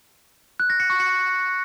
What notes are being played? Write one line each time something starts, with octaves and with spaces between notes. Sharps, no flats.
F#6
A#6
C#7
C#6
C#7